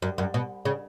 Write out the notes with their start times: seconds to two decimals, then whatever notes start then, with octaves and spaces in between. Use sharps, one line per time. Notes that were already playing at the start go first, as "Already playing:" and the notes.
0.02 F#2
0.18 F#2
0.34 B2
0.65 C#3